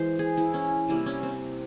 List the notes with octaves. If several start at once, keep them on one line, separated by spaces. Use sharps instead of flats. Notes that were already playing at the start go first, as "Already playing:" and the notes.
Already playing: E3 G#3 C5
G#4
E4
C#4
C3 G3 A#3 E4
C#4
C4